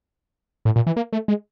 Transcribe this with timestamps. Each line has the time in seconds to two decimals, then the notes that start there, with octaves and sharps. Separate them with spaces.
0.65 A2
0.76 A#2
0.87 E3
0.97 A#3
1.13 A3
1.28 G#3